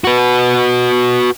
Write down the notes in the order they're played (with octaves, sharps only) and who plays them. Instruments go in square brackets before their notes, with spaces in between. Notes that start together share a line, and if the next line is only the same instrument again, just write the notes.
[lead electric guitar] F#4 B4